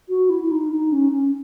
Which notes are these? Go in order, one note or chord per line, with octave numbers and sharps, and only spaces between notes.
F#4
E4
E4
D#4
D#4
C#4
C#4